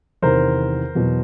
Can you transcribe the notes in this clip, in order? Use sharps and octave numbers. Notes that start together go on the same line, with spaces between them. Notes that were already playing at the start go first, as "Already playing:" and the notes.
E2 C3 D#3 A#4 C5
E2 B2 F#3